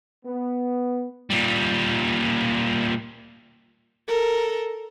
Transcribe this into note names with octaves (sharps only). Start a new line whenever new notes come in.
B3
A#2 G3
A4 A#4